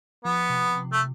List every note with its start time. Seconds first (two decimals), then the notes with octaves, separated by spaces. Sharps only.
0.24 F3 B3
0.50 C3
0.74 C3
0.92 A3